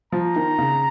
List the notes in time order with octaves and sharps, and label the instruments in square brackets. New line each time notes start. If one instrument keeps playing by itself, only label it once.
[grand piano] F3 [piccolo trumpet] A#5
[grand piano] D#3
C#3